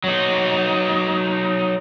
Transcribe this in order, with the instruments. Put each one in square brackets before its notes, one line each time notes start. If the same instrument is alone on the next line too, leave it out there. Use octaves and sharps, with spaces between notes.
[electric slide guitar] F#3 D#4